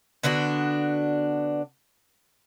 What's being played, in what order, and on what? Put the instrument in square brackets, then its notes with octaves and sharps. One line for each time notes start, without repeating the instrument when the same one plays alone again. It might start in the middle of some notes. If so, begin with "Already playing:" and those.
[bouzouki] D3 B3 D4 F#4